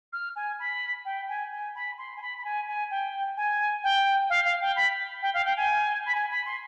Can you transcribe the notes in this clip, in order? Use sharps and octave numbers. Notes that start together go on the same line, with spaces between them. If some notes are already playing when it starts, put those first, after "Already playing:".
F6
G#5
B5
G5
G#5
G#5
B5
C6
G#5
B5
B5
G#5
G#5
G5
G#5
G5
F5
F5
G5
B5
G5
F5
G5
G#5
B5
G#5
B5
C6